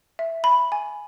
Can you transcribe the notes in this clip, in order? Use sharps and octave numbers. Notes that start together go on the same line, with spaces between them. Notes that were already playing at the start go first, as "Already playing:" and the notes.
E5
B5
G#5